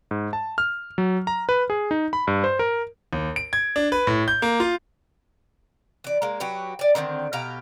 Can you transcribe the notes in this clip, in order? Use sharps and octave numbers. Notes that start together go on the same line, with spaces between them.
G#2
A5
F6
F#3
A#5
B4
G#4
D#4
B5
G2
C5
A#4
D#2
D7
G#6
D4
B4
A2
G6
A#3
F4
E3 D5
G#3 A#3
F#3 F#4 G4 B4
D5 G#5
D3 D#3 A#3 C4
B2 G4 F5 A#5